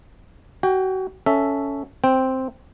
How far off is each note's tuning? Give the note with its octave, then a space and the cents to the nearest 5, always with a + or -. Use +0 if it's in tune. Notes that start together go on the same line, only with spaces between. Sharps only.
F#4 +30 G5 +20
C#4 +10 A4 +5 E5 +0
C4 +0 G5 +0